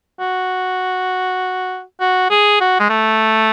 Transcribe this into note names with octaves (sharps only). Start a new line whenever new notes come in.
F#4
F#4
G#4
F#4
G#3
A3